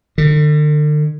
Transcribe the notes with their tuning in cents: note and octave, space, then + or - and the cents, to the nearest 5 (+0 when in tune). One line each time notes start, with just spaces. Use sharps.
D3 +40